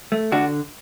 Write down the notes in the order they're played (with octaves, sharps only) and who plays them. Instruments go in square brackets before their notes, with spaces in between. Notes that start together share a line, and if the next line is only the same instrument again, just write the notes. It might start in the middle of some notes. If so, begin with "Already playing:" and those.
[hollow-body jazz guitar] A3
D3 D4 F#4